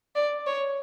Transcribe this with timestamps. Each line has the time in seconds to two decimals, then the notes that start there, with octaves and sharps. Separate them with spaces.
0.15 D5
0.46 C#5